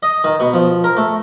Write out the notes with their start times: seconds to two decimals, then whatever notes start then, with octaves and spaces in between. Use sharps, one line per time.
0.03 D#5
0.24 D#3
0.40 B2
0.54 F3
0.84 A#4
0.97 A3